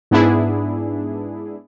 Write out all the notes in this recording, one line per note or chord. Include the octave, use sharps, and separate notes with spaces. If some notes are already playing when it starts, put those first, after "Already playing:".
G#2 B3 D4 E4 G#4